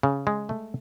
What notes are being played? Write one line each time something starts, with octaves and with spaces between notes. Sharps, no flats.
C#3
G#3
A3